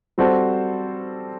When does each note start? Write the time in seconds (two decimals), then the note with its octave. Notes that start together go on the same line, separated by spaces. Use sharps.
0.18 G3 C4 F#4 A4 C5